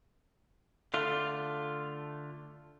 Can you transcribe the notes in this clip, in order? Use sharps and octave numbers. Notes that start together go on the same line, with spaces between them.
D3 A3 F4